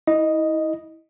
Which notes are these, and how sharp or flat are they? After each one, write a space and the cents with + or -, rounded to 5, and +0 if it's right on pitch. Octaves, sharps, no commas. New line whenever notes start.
E4 -30 D#5 +0